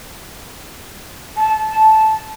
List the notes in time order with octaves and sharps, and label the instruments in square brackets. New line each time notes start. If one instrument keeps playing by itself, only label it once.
[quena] A5